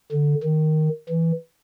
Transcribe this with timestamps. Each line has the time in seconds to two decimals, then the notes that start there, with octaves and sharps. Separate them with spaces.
0.12 D3
0.43 D#3
1.09 E3